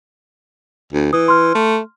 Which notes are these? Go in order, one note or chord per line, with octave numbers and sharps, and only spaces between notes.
D2
E3 D#6
C6 F6
A3